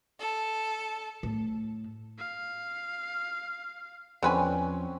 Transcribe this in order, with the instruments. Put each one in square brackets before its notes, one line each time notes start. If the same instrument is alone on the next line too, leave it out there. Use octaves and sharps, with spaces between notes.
[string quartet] A4
[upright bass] A2
[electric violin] F5
[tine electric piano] E2 F3 C5 [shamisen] D3 B4 G#5 [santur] C4 C#4